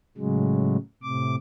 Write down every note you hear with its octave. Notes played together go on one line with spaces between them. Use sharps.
A2 C#3 F#3 G#3
A2 C3 D6